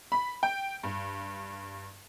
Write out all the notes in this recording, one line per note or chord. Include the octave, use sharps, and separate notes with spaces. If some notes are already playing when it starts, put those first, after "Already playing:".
B5
G5
G2